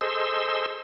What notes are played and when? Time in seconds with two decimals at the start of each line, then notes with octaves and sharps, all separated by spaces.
0.01 G#4 A4 C5 D#5 C6 E6